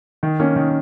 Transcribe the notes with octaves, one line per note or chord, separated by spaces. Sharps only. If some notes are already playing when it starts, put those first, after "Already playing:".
D#3
A#3 C#4
D#3